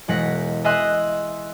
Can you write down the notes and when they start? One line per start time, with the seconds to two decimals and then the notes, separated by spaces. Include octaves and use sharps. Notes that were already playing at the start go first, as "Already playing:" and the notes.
0.08 E1 G#3 F#5 A#6 B6
0.64 D#5 E5 G#5 C6 D#6 F#6